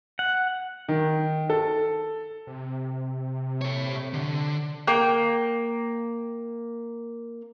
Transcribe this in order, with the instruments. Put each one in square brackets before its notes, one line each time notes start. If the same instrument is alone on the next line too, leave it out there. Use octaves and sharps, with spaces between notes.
[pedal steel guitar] F#5
[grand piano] D#3
A4
[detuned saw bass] C3
[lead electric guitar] A4 C#5
D3
[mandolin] A#3 G5